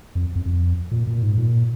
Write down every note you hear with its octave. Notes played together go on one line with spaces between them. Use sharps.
F2
F2
F2
A#2
A#2
G#2
A#2